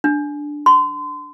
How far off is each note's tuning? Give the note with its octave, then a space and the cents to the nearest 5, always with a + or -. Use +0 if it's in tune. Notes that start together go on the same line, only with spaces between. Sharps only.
D4 +0
C6 -30